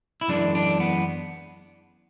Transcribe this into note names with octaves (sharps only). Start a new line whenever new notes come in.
E4
F#2 E3 G#3 D4
D4
B3